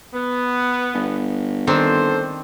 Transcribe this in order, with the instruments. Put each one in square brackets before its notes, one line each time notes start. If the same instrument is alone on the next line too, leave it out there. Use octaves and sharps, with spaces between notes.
[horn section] B3
[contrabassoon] G1
[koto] D#3 C4 D4 [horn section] A4 C5